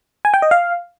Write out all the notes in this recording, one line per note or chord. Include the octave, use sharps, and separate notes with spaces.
G#5
G5
D#5
F5